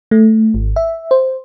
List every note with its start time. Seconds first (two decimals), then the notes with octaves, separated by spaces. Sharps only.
0.11 A3
0.54 G#1
0.76 E5
1.11 C5